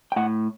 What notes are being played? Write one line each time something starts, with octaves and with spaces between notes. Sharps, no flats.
G5
A2 F#5